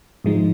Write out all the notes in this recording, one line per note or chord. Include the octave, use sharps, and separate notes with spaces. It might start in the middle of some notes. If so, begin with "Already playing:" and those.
G#2 F3 G#3 D#4